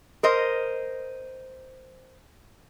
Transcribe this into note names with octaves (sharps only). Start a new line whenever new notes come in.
A#4 C5 D#5